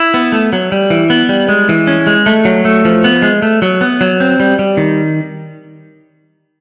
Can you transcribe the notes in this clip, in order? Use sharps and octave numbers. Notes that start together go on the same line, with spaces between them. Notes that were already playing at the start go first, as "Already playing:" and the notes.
Already playing: E4
B3
A3
F#3
G3
E3
B3
G3
G#3
E3
C#4
G#3
A3
F#3
A3
F3
B3
G#3
A3
F#3
B3
F#3
C4
G3
G3
D#3